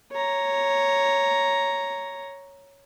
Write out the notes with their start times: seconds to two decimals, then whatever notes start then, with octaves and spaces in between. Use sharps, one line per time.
0.12 C#5 A#5